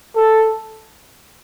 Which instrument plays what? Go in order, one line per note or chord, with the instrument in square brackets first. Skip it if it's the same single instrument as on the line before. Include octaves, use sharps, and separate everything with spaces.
[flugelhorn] A4